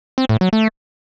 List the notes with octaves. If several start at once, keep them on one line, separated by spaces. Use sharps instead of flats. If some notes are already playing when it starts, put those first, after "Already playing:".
C4
A2
F#3
A3